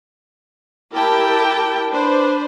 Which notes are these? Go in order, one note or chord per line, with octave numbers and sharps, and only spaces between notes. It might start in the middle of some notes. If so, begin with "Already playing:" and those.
E4 G4 A#4 G5 A5
D4 B4 C5